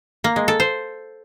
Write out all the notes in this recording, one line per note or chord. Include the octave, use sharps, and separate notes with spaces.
A#3
G#3
A4
C5